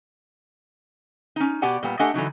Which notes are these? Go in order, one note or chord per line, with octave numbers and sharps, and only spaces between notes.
C#4 D#4
B2 G4 D5 F#5 G#5
A#2 G3 B3
A3 D4 G4 D#5 F#5 G#5
D3 E3 F#3 D#4